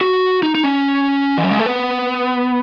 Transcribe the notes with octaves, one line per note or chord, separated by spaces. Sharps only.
F#4
D#4
D#4
C#4
E3
F#3
G#3
A3
B3